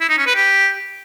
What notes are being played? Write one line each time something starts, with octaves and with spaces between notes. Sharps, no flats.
E4
D#4
C#4
B4
G4